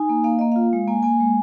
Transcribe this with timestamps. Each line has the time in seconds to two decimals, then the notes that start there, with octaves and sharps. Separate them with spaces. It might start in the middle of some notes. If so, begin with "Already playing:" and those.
Already playing: D#4 G#5
0.09 A#3
0.24 A#3 F5
0.39 A#3 D#5
0.52 F4 F5
0.73 G#3
0.88 A#3 G#5
1.03 A#3 G#5
1.20 G#3